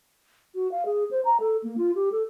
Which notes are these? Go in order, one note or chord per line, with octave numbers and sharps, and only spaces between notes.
F#4
F5
G#4
C5
A#5
A4
A#3
F4
G4
A4